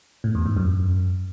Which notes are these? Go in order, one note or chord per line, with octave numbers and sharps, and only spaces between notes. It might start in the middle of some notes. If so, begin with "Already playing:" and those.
A2
E2
G#2
F#2